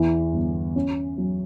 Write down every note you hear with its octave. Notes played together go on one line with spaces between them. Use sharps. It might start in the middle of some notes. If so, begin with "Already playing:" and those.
Already playing: E2 E3
G1
C#4
F#3